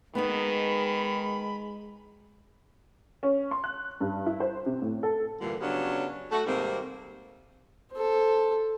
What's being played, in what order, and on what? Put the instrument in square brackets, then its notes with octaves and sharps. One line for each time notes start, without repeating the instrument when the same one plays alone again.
[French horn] D#3 [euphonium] G#3 [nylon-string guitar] B3 D#4 [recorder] B5
[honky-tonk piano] C#4
C6
F#6
G2
E4
C5
C3
A2
A4
[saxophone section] G2 A#2 D3 E3 G3
C#3 F#3 B3 C#4 D4 G4
A3 F#4 A4
G#2 C3 D#3 G3 A#3 C4
[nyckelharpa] A4 C5